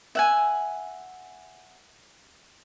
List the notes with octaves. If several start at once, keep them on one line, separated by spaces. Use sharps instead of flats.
E5 F#5 G#5